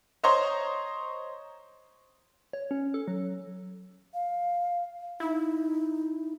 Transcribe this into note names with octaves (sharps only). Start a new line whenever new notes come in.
C5 C#5 D#5 A#5 C6 C#6
C#5
C#4
A4
F#3
F5
D#4 E4